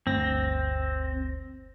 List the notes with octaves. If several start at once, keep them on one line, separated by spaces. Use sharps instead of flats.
G1 D2 C4 A#6